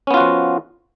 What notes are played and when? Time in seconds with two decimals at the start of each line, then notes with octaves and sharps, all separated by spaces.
0.07 C#4
0.11 B3
0.14 F4
0.17 F#4
0.21 F3